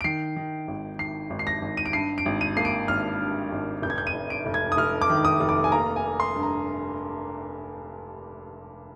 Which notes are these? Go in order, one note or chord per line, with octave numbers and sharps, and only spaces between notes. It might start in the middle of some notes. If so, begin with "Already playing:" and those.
D7
D#3 C7
D#3
G#1
D#3 C7
G#1
C7
A#6
G#1
D#7
D7
G2 C7
D7
G#1
D#7
A#3 C7
D7
G#1 F6
G2
G#1
F1 G6
G#6
G6
D#7
F1
D7
F1
G#6
D#6
F1 F6
D6
D#3
D#6
F1
D6
G#5
A#3 A#5
G#5
A#3
C6
G2
A#5